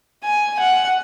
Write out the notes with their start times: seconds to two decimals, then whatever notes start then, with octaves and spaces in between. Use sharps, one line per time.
0.24 G#5
0.60 F#5